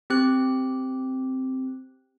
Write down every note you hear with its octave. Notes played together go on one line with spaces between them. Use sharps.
C4 G4 F#6